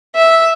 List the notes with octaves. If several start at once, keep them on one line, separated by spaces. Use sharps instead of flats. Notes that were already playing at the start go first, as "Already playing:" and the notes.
E5